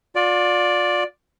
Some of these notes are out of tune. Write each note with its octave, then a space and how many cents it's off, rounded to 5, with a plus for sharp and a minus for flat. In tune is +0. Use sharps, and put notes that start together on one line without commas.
F4 +35 D5 +0